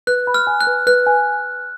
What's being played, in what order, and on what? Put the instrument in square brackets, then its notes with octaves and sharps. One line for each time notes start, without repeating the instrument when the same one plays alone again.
[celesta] B4 [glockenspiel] F#6
[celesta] B5
[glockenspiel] F6
[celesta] G#5
[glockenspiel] F#6
[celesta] B4
[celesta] B4 [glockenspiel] F#6
[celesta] G#5